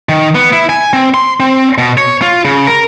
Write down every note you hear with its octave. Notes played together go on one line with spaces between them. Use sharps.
D#3
B3
E4
G#5
C4
C6
C4
B2
C#5
F4
C#3
A#4